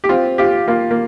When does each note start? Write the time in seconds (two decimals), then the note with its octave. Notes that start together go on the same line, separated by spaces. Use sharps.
0.04 G4
0.09 C4 F4
0.38 F4 G4
0.68 A#3 F4
0.91 A#3